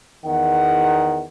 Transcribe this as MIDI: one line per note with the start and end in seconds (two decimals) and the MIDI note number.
0.25 1.23 40
0.25 1.23 51
0.25 1.23 78